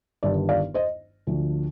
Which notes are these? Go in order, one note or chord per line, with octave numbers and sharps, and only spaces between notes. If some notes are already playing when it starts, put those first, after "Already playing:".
G1 G2 D#3 D5
D5 F5
C5 D#5
D2 D3 F3